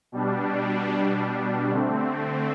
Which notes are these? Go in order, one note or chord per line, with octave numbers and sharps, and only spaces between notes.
B2 G3 D4
D3 A3 C4